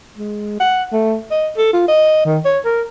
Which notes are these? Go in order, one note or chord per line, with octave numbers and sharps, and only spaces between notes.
G#3
F#5
A3
D#5
A4
F4
D#5
D#3
C#5
A#4